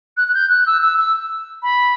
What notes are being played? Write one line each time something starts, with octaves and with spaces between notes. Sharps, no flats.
F#6
F#6
G6
F#6
E6
E6
E6
B5